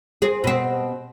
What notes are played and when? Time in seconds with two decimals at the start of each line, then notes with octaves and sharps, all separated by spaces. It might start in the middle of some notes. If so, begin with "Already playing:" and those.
0.22 C4 G#4
0.44 B2 C4